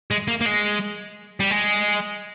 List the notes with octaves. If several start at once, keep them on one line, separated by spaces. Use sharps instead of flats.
G#3
A#3
A#3
G#3
G3
G#3